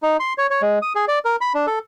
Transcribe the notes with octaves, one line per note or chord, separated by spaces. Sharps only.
D#4
C6
C#5
C#5
G#3
D#6
G#4
D5
A#4
B5
D4
A4